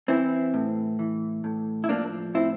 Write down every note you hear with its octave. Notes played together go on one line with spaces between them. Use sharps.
E3 C4 E4
A2
E3
A2
E4
F3 A#3 D4
A2 C4 E4